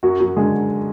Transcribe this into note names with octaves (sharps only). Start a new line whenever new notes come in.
F#2 F#3 F#4
F#3 F#4
D3 G#3 G#4